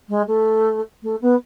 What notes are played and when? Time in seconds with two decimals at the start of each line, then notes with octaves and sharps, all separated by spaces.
0.08 G#3
0.27 A3
1.02 A3
1.21 B3